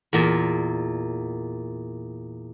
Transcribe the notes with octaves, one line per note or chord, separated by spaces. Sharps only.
E2 A#2